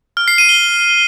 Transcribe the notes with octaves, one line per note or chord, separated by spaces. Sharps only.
F6
C7
D#7
G7